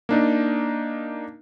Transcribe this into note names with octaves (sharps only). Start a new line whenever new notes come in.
A#3 D4 D#4